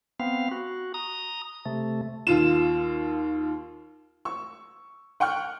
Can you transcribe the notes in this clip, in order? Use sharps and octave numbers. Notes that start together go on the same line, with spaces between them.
B3 C4 F5
F#4
A#5 D#6
C3 A3
D#2 F4 E7
C#6 E6
F#5 G5 C#6 F6 F#6